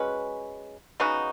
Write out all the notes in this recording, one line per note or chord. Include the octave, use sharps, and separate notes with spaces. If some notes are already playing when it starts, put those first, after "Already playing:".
Already playing: G#3 C#4 F#4 B4
C#3 B3 D#4 F#4